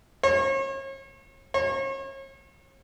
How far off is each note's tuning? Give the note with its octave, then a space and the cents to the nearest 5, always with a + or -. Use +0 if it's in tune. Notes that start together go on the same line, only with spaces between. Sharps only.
C#5 -40
C#5 -40